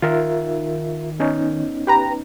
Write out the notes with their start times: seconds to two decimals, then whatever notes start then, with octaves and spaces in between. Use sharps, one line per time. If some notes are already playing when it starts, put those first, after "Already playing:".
0.02 D#3 F4 A#4 E5
1.20 B3 C#4 D#4
1.87 G4 B4 A#5